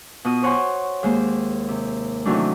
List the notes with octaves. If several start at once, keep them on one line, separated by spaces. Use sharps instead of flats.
B2 F4 D#6
C5 C#5 F#5 G#5 C6
D#2 G#3 A#3 C5 C6
C3
C3 D#3 E3 F#3 A3 D4